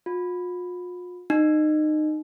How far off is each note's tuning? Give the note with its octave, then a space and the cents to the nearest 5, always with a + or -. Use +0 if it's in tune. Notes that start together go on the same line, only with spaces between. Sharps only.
F4 +45
D#4 -25